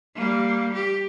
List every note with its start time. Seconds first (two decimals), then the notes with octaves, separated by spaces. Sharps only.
0.15 G3 A#3
0.74 G4